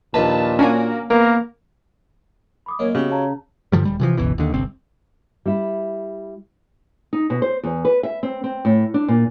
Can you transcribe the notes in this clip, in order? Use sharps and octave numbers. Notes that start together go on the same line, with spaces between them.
A#1 D#2 A#2 B4 A5
A#3 C#4 D4 F#4 A#4 G#5
E2 A#3 A#4
B5 D6 D#6
F#2 A#3 C#5 D#5
C#3 B3 F#4 G4 E5
C#5 F5 A5 A#5
G2 D3 F3 G3
D#1 G3
C3 E3 F3
G1 C#2 B2 E3
D#2 D3
G1 C2 C4
G3 E4
D#4
B2
C5
E2
B4
E5
C4
C4
A2
D4
A#2